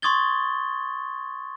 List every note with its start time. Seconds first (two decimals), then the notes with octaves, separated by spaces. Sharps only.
0.02 C6 C#6 D#6 G#6 A6 G7